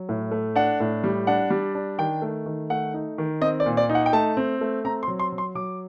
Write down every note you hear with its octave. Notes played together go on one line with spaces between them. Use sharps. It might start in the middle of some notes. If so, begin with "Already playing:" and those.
Already playing: F#3
A2
A3
D4 F#5
A2
G3
D4 F#5
G3
D4
D#3 G5
A3
D#3
A3 F#5
D#4
D#3
C4 D#5
D5
A#2
D5
D#4
F#5
G5
A3 A5
C4
A3
C4 A#5
C6
F#3
C6
F#3
C6
F#3 D6